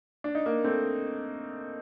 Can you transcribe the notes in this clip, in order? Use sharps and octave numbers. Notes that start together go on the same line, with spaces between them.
D4
D#4
A#3 D4
A3 C4